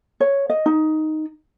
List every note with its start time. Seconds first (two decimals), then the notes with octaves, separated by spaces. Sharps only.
0.20 C#5
0.50 D#5
0.66 D#4